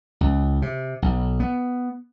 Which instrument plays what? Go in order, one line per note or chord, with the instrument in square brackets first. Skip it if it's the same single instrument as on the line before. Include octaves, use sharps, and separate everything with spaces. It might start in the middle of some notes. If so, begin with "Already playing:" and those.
[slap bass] C#2
C3
B1
B3